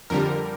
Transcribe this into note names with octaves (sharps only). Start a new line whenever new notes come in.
F2 D3 G3 A#4